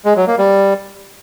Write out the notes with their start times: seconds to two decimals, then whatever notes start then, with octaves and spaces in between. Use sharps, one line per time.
0.05 G#3
0.16 F#3
0.27 A#3
0.38 G3